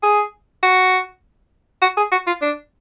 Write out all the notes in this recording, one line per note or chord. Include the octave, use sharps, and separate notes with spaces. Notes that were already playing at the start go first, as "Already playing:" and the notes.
G#4
F#4
F#4
G#4
F#4
F4
D4